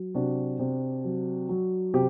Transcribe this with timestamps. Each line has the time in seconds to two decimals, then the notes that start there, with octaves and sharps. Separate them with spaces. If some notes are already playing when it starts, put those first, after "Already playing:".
Already playing: F#3
0.14 C3 D4 F#4
0.59 C3
1.04 F#3
1.49 F#3
1.94 C3 G4